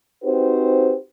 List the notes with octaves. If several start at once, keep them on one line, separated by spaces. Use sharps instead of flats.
C4 D#4 F#4 G4 B4 C5